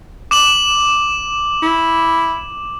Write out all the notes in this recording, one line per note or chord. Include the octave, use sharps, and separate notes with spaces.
D6 E7 F#7
E4